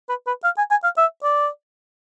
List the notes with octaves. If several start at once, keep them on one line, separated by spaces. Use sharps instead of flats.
B4
B4
F5
G#5
G#5
F5
E5
D5